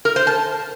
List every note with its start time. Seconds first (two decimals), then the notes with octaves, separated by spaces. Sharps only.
0.05 A#4
0.16 C5
0.27 A5